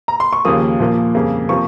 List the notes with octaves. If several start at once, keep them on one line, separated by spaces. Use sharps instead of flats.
A#5
C6
C#6
D#2 C#3 F3 A#3 D#6
A#2 F3 A#3
F2 C#3 G3 A#3
C3 F3 A#3 C#6